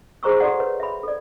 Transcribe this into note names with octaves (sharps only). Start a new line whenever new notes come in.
G4 G#4 C5 A#5 C#6 E6
F#4 A4 D5 F#5
B4 C#5
E5 B5
A4 D5